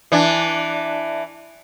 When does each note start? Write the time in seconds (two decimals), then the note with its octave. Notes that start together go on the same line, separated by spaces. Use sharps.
0.12 E3 D4